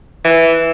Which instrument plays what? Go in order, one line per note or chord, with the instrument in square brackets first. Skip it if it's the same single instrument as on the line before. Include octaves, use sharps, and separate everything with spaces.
[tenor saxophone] E3